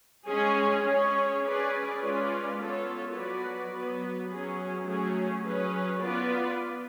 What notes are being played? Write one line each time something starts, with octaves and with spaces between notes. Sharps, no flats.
G#3 C#4 G#4 C#5
C#4 G#4 C#5
C#4 G#4 B4 D5
G#3 C#4 F4 B4 D5
B3 F4 A4 C#5
F#3 B3 F#4 B4 D5
F#3 B3 F#4 B4
F#3 C#4 G#4
F#3 A3 C#4 G#4
F#3 C#4 G#4 B4
B3 F4 B4 D5